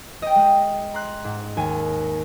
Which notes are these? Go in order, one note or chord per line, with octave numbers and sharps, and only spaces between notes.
D#5 G5
G#3
A#5 C6 F#6
G#2
D#2 G#5